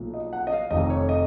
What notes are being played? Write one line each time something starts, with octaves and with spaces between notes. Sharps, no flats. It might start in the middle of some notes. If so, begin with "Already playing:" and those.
Already playing: B1 A#2 F3
D#5
F#5
D#5
F5
F1 F2 D#3 D#5
C#5
D#5